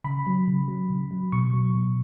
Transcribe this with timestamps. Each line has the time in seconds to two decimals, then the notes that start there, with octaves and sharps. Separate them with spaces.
0.04 C#3 B5
0.27 F#3
0.48 C#3
0.68 F#3
0.90 C#3
1.11 F#3
1.32 B2 C#6
1.53 F#3
1.75 B2